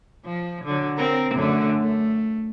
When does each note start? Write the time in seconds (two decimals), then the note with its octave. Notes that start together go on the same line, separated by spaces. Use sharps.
0.25 F3
0.64 D3 F#3
0.97 C4 A#4
1.35 F#2 D3 A3
1.81 A3